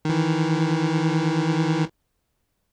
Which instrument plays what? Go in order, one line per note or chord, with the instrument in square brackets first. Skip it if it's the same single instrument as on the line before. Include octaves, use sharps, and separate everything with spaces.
[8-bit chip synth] D#3 E3